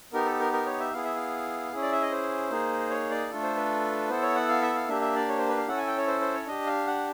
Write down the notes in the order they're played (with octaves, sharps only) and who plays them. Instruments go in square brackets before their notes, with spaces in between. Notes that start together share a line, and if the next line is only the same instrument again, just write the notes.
[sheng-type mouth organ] B3 D#4 G4 A#4
A4
A#4
A#4
C#5
E5
B3 E4 G#4 F5
E5
F5
C#4 E4 G#4
D5
E5
D#5
C5
A#3 D#4 G#4
C#5
D5
A3 D4 F4 A4
C5
B4
B3 E4 A4 C5
C#5
F#5
F5
E5
F5
A#3 D4 G4 E5
E5
D5
C#5
C5
B4
F5
C#4 E4 A4 F#5
G#5
G5
C#5
C5
C5
C#5
D4 G4 D#5
F5
F#5